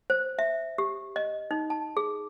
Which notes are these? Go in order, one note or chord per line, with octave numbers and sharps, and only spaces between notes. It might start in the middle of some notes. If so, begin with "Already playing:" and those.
C5
E5
G4
D#5
D#4
A5
G#4